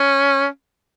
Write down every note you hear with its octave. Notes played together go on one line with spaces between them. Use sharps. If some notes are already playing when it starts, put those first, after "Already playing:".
Already playing: C#4